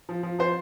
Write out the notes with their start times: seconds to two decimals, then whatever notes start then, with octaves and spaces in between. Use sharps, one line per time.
0.09 F3
0.23 F3
0.39 F3 C5 C6